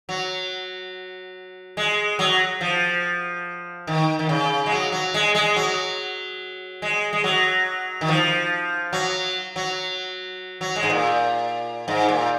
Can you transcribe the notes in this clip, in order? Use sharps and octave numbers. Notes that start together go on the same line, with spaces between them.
F#3
G#3
F#3
F3
D#3
D#3
C#3
G#3
F#3
F#3
G#3
G#3
F#3
G#3
G#3
F#3
D#3
F3
F#3
F#3
F#3
G#3
G#2
A#2
G#2
A#2